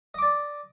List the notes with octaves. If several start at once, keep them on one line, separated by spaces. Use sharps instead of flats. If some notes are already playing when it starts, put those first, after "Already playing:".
D5 D#5 D6